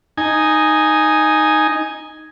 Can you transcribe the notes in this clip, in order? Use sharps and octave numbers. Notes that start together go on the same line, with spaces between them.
D#4 G#5